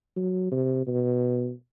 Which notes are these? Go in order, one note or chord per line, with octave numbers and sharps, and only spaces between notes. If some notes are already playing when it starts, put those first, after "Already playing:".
F#3
C3
B2